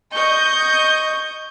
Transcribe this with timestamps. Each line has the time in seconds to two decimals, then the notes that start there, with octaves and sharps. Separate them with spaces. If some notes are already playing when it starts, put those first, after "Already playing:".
0.12 D#5 C#6 G6